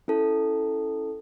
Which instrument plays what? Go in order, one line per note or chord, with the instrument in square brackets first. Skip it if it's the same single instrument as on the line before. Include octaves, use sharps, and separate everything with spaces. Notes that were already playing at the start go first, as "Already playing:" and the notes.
[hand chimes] C#4 E4 A4